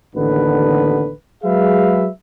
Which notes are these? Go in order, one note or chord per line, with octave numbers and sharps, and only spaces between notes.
A1 D#2 D3 B3 B4
F#3 G#3 G#4 B4 E5 F5